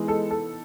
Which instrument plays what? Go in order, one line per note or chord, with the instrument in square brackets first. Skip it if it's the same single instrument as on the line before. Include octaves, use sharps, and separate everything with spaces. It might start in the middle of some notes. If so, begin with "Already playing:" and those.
Already playing: [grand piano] E3 B3 D#4 [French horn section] G#3
[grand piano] A4
A4